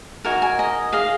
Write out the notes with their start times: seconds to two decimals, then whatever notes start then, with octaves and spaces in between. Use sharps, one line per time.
0.25 D#4 F#4 A#4 G#5
0.42 G#5
0.59 D#5
0.92 G#4 D#5 F5